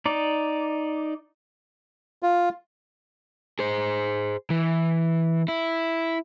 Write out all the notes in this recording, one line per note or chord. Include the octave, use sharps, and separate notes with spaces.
D#4 D5
F4
G#4 C5
E3
E4